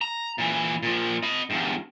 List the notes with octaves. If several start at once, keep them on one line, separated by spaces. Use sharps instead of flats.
A#5
A#2 E3
A#2 F3
D#5 B5
E2 G2